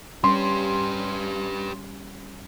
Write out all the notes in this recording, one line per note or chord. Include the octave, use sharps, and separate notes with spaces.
G3 C#4 G4 B4 C6